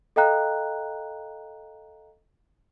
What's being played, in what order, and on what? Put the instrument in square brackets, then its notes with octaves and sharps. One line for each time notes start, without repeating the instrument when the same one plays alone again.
[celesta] A4 D#5 F5 G5 A#5 F#6